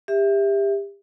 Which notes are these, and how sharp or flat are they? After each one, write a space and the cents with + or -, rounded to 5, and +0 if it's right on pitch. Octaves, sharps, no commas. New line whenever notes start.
G4 +25 E5 +0